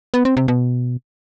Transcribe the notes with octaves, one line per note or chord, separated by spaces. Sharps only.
B3
C4
C3
B2